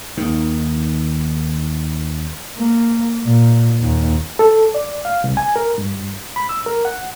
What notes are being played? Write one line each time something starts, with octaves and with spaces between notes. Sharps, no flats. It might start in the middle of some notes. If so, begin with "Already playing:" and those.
D#2 D#3
A#3
A#2
D#2
A4
D5
F5
C2
G#5
A#4
G2
B5
E6
A#4
F#5